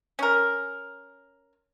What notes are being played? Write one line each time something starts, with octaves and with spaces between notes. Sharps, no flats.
C#4 A#4